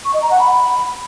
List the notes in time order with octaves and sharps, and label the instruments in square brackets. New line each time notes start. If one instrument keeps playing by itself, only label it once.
[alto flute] C#6
D#5
A#5
F#5
B5